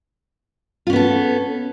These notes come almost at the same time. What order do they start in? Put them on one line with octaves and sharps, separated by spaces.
F4 C#4 B3 A4